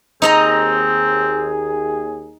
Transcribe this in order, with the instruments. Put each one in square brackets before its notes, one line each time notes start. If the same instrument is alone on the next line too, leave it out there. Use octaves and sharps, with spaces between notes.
[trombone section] D#2 G#4 [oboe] C4 [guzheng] D#4 D#5 A#5